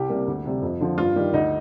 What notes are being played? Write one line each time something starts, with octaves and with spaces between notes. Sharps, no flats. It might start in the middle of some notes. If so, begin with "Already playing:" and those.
Already playing: C2 G4
C3 G3 A#3
D2
C3 G3
F2
D3 F3
G2 F4
D#3 G3
D2 D#4